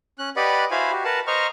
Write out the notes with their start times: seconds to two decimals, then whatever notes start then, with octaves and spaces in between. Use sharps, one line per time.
0.19 C#4 F#6
0.36 G4 B4 D5 D#5 F#5 B5
0.71 E4 F#4 C5 F5 G#5 B5
0.92 F#4 G4
1.05 A#4 B4 F#5 A5
1.27 C5 D#5 A#5 C#6 F6